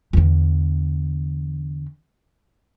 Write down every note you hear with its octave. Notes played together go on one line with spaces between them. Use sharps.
E2 D3